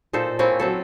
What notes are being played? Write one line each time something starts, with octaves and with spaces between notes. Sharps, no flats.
A#2 D#4 A4 C5
A#3 C4 C#4 E4
F#3 C4 A4